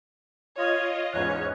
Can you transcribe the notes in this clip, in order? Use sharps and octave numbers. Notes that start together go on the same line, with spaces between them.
F4 C#5 D#5
E2 G#2 C#4 C#5 F#6